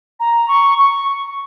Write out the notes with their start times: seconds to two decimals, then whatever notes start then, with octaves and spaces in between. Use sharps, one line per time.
0.20 A#5
0.48 C#6
0.78 C#6